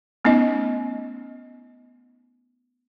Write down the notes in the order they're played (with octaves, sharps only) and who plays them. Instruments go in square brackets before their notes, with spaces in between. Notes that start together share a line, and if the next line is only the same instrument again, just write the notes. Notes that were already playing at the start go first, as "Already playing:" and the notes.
[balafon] A3 B3 C#4 D#4 D#5